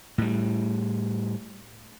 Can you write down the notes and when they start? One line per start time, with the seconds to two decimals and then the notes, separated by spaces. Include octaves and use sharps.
0.18 A2 G3